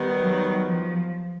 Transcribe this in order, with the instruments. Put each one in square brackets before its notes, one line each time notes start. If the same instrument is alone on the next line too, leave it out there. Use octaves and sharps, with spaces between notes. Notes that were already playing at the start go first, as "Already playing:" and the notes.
Already playing: [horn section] D#3 G3 B3
[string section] F#3
F3